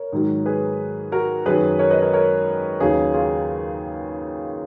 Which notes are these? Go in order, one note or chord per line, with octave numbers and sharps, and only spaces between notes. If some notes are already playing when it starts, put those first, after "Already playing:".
Already playing: A#4 C#5
G#2 D#3 F#3
G#4 B4
F#4 A#4
F#2 D#3 F#3 G#4 B4
A#4 C#5
B4 D#5
A#4 C#5
A#4 C#5
D#2 C#3 F#3 G#4 B4
F4 G#4